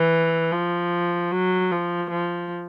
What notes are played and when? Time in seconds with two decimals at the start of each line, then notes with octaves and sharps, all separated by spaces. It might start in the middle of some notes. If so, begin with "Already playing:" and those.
Already playing: E3
0.51 F3
1.31 F#3
1.71 F3
2.10 F3